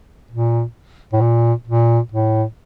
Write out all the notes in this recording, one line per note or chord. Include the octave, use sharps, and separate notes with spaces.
A#2
A2
A#2
A#2
A2